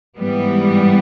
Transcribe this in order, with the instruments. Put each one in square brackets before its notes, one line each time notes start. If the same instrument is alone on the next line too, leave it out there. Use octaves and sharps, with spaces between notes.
[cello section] G#2 E3 G3 B3